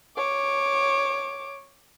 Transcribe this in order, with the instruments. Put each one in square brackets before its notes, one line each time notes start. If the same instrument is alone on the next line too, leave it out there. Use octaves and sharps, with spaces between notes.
[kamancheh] C#5 D6